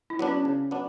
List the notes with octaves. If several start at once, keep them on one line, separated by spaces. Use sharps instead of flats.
E4
F#3 B3 D4
C#4
C#3
F#3 B3 D4